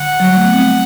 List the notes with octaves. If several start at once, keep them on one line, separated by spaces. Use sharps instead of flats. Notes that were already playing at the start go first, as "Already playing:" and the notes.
Already playing: D3 F#5
F#3
G3
A3
B3
C4